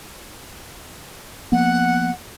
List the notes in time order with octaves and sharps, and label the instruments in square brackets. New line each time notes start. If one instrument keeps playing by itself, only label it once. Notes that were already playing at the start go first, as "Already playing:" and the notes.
[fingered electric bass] F3 A#3 B3 [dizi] F#5